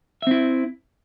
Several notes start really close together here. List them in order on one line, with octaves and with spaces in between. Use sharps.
E5 C4 E4